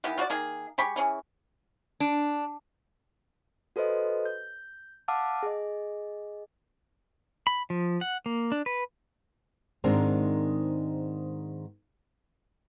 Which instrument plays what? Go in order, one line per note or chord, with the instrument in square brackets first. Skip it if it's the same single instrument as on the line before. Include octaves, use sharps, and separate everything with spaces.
[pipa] D#3 E3 B3 G4
F4 F#4 B4 D5
D#3 A#3 G#4
G#3 G4 B5 C#6
E3 C#4 G#4
[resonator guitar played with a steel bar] D4
[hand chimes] F#4 A4 B4 C5 D#5
G6
F5 F#5 A5 D6 E6 F6
G#4 D#5
[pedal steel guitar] B5
F3
F#5
A#3
D4
B4
[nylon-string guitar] G#2 D#3 G#3 C4 D4 A#4